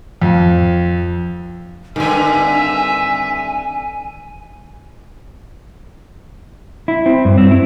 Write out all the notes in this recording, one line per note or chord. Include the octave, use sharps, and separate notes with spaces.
F2
G2 D3 D#3 C4 E5 G#5
E4
C4
G2
C4
E4